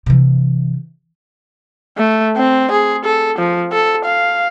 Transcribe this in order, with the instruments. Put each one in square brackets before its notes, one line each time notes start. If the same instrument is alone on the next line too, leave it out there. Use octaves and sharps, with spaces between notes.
[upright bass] C3 E3
[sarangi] A3
C4
G#4
A4
F3
A4
F5